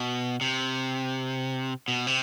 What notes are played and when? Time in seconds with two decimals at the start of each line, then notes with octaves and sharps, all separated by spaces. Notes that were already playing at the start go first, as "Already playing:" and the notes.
Already playing: B2
0.41 C3
1.88 B2
2.07 C3